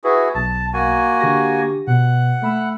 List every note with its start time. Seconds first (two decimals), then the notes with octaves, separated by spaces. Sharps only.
0.04 E4 F#4 G#4 B4
0.35 B1 A5
0.74 A#3 F#4 G#5
1.19 D3 G4 A#6
1.87 B2 F#5
2.42 A3 B5 E6